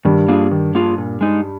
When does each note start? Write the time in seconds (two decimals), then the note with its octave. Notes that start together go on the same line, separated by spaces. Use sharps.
0.05 G2 D#3 G3
0.29 A#3 D4 F4 G#4
0.51 D#3
0.75 A#3 D4 F4 G#4
0.98 A#2
1.21 G#3 D#4